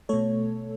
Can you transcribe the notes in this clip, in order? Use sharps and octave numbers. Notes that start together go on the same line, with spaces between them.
B2 A3 A4 C#5